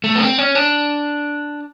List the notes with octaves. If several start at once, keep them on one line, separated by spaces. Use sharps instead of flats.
A3
B3
C4
C#4
D4